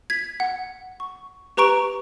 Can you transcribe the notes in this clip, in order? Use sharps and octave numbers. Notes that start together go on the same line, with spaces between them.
G#6 B6
F#5
C#6
G4 B4 A#5 C#6 D7